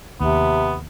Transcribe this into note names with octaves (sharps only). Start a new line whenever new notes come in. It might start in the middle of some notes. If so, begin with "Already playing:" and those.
D#2 C3 B3